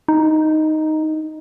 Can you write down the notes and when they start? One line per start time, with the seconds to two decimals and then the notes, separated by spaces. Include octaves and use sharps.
0.08 D#4